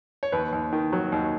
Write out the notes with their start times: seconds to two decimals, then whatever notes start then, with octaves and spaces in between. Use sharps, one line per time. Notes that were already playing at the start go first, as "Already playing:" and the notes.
0.23 C#5
0.32 D#2 B4
0.53 D#2
0.72 D#3
0.93 F#3
1.12 D#2